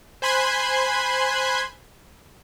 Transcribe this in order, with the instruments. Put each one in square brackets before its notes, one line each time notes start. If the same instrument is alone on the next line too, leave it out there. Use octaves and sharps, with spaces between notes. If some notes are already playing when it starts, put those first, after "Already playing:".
[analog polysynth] C5 G#5 B5 C6 F#6 G#6